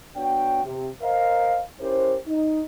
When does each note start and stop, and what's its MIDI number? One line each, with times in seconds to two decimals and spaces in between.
0.16 0.64 59
0.16 0.64 62
0.16 0.64 66
0.16 0.64 73
0.16 0.64 79
0.64 0.89 48
1.02 1.59 70
1.02 1.59 72
1.02 1.59 75
1.02 1.59 77
1.80 2.15 61
1.80 2.15 64
1.80 2.15 67
1.80 2.15 70
1.80 2.15 72
2.27 2.63 63